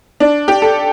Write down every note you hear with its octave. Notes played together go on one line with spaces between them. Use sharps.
D4
G4
A4